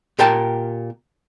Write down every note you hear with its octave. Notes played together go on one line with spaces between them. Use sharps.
A#2 G4 A#4 G5 A5